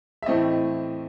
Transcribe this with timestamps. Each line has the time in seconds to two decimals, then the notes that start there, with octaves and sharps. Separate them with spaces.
0.22 E5
0.26 A2 E3 A3 C4 D#5